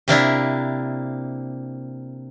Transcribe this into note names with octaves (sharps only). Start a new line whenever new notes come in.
C3 A#3 D4 E4